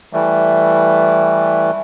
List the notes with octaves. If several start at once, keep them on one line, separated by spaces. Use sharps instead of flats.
E3 G3 A3